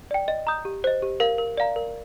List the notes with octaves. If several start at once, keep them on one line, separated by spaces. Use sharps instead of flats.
D5 G5
D#5
A#5 D#6 G6
G4
C5 D#5
G4
A#4 F5
A#4
D5 F5 A#5
A#4